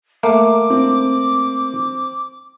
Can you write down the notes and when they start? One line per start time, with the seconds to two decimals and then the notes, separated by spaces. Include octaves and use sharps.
0.23 A3 A#3 D6
0.70 C4